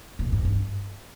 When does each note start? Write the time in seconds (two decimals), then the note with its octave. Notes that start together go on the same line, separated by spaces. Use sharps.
0.19 A#2
0.32 G#2
0.45 G2